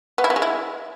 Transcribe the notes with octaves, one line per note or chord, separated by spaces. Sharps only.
B3
E4
B3
G#3
E4